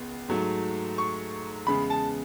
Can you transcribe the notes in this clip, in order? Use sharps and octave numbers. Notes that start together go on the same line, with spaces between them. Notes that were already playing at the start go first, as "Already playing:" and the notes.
Already playing: C#2 B3
G#2 F#3 A3
C#6
E2 C#3 G#3 B3 B5
A5